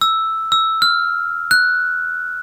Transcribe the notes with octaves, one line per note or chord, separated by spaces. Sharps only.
E6
E6
F6
F#6